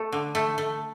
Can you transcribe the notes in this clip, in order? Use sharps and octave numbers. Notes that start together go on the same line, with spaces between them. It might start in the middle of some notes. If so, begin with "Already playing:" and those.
Already playing: A3
D3
A3
A3